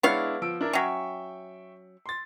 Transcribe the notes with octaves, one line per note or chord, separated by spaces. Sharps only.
G#3 B3 D4 E4 C#5 F5
F3 E6 D7
D4 E4 A#4
F#3 C#4 E5 G5 C#6
C6 A6